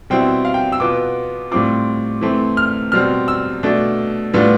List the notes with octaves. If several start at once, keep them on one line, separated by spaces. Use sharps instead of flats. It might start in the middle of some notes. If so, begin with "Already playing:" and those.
B2 G3 C4 E4 G5
F5
G5
E6
B2 B3 F4 D6
A2 G3 C4 F4 D6
E3 A3 C4
F6
B2 G3 C4 F6
E6
B2 A3 D4
A2 G3 B3 D4 F4